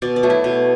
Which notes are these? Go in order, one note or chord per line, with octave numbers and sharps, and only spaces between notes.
B2 D5
D5
F#3 A3
E4
B2